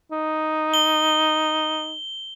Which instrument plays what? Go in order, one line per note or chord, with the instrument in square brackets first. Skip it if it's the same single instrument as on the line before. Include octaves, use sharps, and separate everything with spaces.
[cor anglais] D#4
[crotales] G7